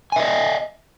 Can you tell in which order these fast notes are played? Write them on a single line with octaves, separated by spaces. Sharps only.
G#5 E5 D#5